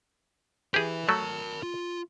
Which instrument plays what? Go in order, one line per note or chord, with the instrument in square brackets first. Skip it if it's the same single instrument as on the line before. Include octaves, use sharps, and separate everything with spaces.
[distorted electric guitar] E4 B4 [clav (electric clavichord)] G4 G#4
[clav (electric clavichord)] F#3 A3 [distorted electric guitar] A#4 A5
[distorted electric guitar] F4